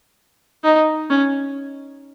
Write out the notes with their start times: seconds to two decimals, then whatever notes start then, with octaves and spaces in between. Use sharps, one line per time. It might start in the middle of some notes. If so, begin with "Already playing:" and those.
0.64 D#4
1.10 C#4